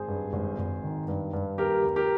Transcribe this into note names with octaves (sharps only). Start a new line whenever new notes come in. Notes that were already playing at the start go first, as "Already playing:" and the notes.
Already playing: G#1 G#4 C5
G2
G#1
G#1
D#3
G2
G2
D#2 G4 A#4
D#2
G4 A#4